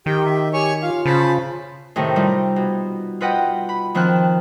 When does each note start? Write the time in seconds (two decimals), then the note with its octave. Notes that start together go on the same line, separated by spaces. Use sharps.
0.06 D#3 G4 G5
0.25 E5
0.53 G4 C#5 G#5 C#6
0.82 F4 F5
1.06 C#3 C5 A5 B5
1.96 A2 C3 D#3
2.16 G3 D#4 F4
2.56 B2
3.21 F4 B4 D#5 F#5 G5
3.69 B5
3.95 D#3 F3 C4 F6 F#6